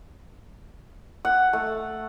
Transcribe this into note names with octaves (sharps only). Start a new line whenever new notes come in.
F#5
A3